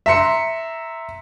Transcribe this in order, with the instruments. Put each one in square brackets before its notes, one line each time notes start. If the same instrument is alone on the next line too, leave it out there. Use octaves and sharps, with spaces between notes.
[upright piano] E5 A#5 C6 C#7